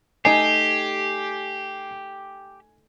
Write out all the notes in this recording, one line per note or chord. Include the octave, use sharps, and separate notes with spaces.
A3 D#4 G4 G#5 C7